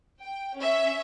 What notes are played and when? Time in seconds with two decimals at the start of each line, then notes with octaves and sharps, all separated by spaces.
0.21 G5
0.57 C#4 E5